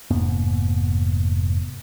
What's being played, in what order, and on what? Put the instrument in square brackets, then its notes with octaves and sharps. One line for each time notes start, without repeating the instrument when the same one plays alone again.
[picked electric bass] F1 G#2 A#3 B3